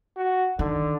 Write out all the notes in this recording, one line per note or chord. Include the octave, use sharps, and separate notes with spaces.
F#4
D3 D#3